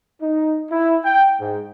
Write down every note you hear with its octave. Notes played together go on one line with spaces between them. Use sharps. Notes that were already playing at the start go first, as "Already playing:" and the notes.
D#4
E4
G5
G#2